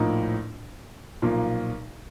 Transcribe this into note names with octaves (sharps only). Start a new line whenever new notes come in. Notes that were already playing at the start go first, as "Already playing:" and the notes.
Already playing: A#1 A2 F3 A#3 D#4
B1 A#2 F3 A#3